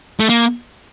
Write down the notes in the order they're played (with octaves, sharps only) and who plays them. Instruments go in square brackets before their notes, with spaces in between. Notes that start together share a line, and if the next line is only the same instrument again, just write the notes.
[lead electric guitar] A3
A#3